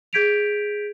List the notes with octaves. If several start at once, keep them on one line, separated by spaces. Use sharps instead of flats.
G#4 G6 G#6 B6 D7 F7